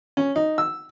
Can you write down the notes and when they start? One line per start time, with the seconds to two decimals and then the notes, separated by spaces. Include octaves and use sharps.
0.17 C#4
0.36 D#4
0.58 E6